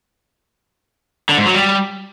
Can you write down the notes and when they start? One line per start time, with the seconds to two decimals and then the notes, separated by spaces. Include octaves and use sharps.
1.29 D3
1.38 G#2
1.46 F#3
1.54 G3